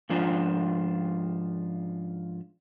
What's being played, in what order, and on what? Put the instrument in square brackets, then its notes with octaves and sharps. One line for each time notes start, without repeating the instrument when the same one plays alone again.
[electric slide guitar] G#2 F3 D4 F4